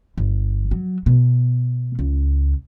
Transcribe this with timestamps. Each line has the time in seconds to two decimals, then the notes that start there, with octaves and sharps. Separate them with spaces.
0.18 G1
0.71 F#3
1.06 B2
1.99 C#2